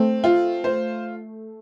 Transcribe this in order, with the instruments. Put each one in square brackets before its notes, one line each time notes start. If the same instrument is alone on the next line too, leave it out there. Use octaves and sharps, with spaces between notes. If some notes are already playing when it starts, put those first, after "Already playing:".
Already playing: [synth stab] A3 [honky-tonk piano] C4
[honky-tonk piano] F4
C5